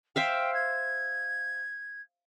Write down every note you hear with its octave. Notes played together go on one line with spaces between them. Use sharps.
C5 E5 F5 G5
G#6